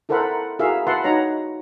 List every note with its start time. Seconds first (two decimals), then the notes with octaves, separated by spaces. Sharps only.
0.09 E4 A4 A#4 C5 F#5 B5
0.59 E4 F#4 G#4 A#4 E5 F5
0.87 B4 E5 F#5 A5 C6
1.04 D#4 F#4 C#5 A#5